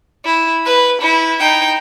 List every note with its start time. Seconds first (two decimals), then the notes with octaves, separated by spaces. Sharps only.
0.25 E4
0.66 B4
1.01 E4
1.40 D#4 G5